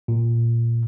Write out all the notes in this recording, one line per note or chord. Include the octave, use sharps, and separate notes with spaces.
A#2